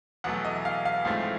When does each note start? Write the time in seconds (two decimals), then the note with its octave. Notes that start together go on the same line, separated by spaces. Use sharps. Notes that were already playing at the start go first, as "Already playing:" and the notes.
0.24 E2 B2 F#3 A3 F#5
0.44 D#5
0.65 F5
0.85 F5
1.05 A1 G#2 F3 A3 C4 F5